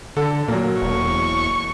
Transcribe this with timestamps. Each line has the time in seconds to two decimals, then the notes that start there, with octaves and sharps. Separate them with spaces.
0.17 D3 A4
0.48 A#2 F#3 A#3
0.82 E1 C#6